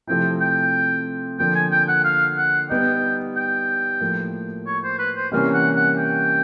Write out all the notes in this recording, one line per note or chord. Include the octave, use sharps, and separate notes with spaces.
C3 F3 A3 C4 E4 G5
G5
D3 F3 A#3 G5
G#5
G5
F#5
F5
F#5
G3 B3 D#4 G5
G5
A2 F3 A#3
C#5
C5
B4
C5
C3 E3 G3 A#3 C#4 F5
F#5
F#5
G5